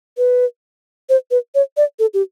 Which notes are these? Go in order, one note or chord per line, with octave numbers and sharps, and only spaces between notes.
B4
C5
B4
C#5
D5
A4
G4